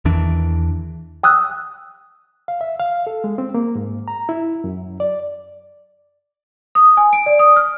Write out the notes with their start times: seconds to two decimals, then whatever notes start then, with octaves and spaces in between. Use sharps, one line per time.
0.05 E2 D#3 E3 D4
1.23 G5 D#6 E6 F#6
2.48 F5
2.61 E5
2.80 F5
3.07 A4
3.24 G#3
3.38 C4
3.54 A#3
3.75 G#2
4.08 A#5
4.29 E4
4.64 F#2
5.00 D5
6.75 D#6
6.97 G#5
7.13 D7
7.26 D5
7.39 D#6
7.56 F6